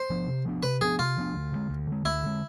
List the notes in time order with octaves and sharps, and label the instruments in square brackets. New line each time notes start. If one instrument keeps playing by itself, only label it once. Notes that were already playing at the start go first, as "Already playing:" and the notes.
Already playing: [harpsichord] C5
[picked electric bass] F3 B3 D4
C3
F3 B3 D4
[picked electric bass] C3 [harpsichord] B4
[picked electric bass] F3 B3 D4 [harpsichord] G#4
[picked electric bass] C3 [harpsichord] F4
[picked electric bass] F3 B3 D4
D2
D3 G#3
D2
D3 G#3
[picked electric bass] D2 [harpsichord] E4
[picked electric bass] D3 G#3